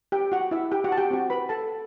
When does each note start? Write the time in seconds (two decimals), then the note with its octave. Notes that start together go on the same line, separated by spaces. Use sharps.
0.12 G4 G5
0.32 F#4 F#5
0.51 E4 E5
0.71 G4 G5
0.84 F#4 F#5
0.92 A5
0.97 G4 G5
1.11 C4 F#4
1.30 B4 B5
1.49 A4 A5